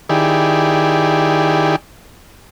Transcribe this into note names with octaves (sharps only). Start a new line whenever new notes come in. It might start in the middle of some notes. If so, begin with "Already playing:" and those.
D#3 E4 G4 G#4 D5